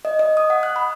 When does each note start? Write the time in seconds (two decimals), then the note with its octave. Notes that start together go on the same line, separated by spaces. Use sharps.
0.05 D#5
0.19 D#5
0.37 D#6
0.50 F#5
0.63 F#6
0.76 B5